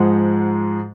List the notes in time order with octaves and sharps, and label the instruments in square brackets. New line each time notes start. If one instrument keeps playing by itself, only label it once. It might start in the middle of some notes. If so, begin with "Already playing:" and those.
Already playing: [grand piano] G#2 F3 G#3 F#5